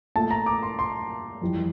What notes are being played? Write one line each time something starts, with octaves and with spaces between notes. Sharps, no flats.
A#2 A3 A5
A#5
D6
C6
C6
F2 E3 G3